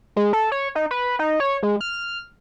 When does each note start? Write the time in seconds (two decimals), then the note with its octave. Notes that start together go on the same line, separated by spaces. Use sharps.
0.16 G#3
0.33 A4
0.52 C#5
0.75 D#4
0.91 B4
1.19 D#4
1.40 C#5
1.63 G#3
1.81 F6